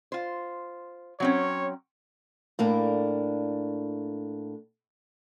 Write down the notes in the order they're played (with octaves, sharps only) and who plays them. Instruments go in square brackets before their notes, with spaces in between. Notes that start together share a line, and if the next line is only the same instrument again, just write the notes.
[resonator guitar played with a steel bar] F4 C5
[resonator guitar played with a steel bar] F#3 C4 C#4 [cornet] C#5
[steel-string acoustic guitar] A2 A#3 D4